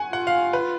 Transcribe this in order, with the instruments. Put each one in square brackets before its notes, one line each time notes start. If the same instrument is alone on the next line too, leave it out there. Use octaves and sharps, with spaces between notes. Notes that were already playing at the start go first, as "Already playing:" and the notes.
Already playing: [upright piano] F#5 G#5
[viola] F4 [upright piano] F#5
[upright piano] F5
B4